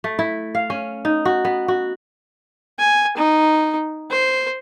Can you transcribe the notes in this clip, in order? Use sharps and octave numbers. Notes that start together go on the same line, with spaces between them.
A3
E4
F5
C#4
D#4
F#4
B3
F#4
G#5
D#4
C5